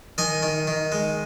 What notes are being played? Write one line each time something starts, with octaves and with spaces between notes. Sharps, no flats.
D#3 D#5 G#5
D#3
D#3
G#3